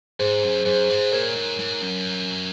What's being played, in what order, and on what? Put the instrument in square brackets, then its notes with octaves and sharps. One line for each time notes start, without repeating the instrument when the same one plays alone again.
[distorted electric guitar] G#2 [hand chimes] G#4 C5
[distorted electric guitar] F#2
[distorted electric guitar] F#2 [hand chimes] G#4 C5
[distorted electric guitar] G#2
[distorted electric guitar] A#2 [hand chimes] A#4 C#5
[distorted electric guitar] G#2
G#2
F#2